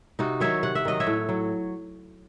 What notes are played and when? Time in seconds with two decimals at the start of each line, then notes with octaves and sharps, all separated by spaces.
0.19 C3 D#4 F#4
0.40 D#3 F#3 C#5 E5
0.63 C3 F#5
0.75 E5
0.85 D#3 F#3 D#5
1.00 C#5 E5
1.07 A2
1.29 F#3